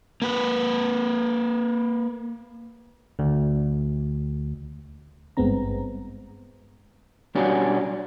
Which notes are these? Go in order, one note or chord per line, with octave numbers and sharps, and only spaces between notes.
A#3 B4
D2
G#1 G2 G#3 B3 C4 A#5
B2 G3 C#4 D4 F#4 G#4